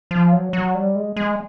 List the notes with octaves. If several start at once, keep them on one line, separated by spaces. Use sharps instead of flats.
F3
F#3
F#3
G3
G#3
G#3